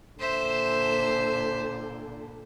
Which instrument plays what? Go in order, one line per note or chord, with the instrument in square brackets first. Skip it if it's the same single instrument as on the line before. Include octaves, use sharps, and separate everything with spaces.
[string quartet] A#2 D3 [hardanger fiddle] C5 E5